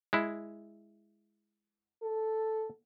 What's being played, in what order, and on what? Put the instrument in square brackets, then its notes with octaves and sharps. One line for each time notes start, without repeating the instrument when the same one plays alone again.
[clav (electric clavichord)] G#3 E4
[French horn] A4